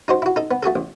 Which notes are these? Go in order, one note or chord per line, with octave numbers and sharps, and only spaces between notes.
D#4 F#4 C5
E4 F#4
D#4 A4
B3
A3 F#4 G#4 A4
A1